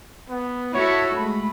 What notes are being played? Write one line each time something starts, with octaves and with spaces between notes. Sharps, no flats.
B3
E4 F#4 A4 C#5
G#3 A3 B5